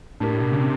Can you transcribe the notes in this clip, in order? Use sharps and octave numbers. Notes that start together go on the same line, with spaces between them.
A2 D4 G4 A#4
B2
C#3
C3